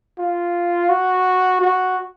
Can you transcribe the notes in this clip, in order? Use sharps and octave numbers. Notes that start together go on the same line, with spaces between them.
F4
F#4
F#4